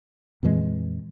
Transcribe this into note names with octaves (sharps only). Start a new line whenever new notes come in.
F2 A#2 E3 G#3